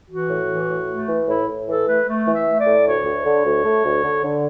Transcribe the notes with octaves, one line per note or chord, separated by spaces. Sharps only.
E3 F#4
A2
E3
A2
A3
E3
A2 E4
A2
E3 A4
A3 B4
A3
E3
E5
A3
D5
A2
D2 C#5
D2
D3
D2
A3
D2
D3
D3